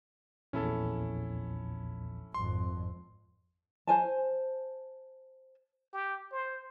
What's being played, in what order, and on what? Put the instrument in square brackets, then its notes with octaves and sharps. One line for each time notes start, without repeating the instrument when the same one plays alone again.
[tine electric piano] A#1 E2 [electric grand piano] C#4 E4 A4
[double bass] G#1 F2 [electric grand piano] C6
[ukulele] C5 G#5 A5
[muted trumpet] G4
C5